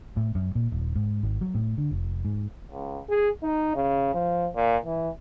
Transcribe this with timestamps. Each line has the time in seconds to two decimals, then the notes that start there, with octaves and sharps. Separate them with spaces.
0.17 A2
0.35 F#2
0.55 A#2
0.72 D#1
0.95 G#2
1.23 G#1
1.41 F#3
1.54 A2
1.78 D3
1.91 F1
2.25 G#2
2.71 C#2
3.09 G#4
3.43 D#4
3.75 C#3
4.14 F3
4.55 A#2
4.85 E3